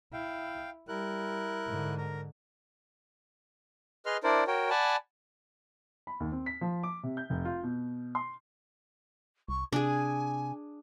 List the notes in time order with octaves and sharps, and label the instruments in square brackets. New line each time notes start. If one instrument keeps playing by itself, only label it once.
[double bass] E4 [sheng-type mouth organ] F5 G5
[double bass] G3 [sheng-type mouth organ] E4 A#4 F#6
[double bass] G#2 D3
[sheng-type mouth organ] A#4 A#5
G#4 B4 D#5 C6 F6
D4 E4 A#4 C5 D5
F#4 A#4 C#5 G5
D5 F#5 G#5 A5 B5
[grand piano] B5
D#2
C4
B6
F3
D6
C3
G6
F1
F4
B2
C6
[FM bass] C2 [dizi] C#6
[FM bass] C3 [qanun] D4 G#4 [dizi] G#5